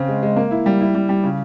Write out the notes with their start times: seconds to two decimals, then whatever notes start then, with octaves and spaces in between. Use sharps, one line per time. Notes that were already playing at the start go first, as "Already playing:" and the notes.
Already playing: C#3 C4
0.08 G#3
0.23 G#3
0.36 A#3
0.51 E4
0.66 G3
0.81 E4
0.95 G3
1.09 G3
1.24 C#3